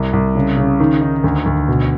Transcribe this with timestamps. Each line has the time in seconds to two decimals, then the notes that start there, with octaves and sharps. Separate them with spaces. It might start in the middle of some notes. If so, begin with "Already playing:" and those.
Already playing: C2
0.13 C2
0.35 C#3
0.57 C#3
0.80 D#3
1.01 D#4
1.24 D2
1.46 D2
1.68 B2